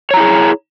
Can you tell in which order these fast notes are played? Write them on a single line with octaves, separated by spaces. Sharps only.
C#5 A#5 E4 G#4